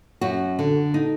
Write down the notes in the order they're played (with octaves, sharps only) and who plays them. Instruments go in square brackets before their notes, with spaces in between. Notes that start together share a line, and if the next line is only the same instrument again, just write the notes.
[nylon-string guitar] F#2 F#4
D3
D#4